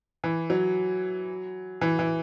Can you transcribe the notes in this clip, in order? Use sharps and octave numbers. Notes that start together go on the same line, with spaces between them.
E3
F#3
E3
E3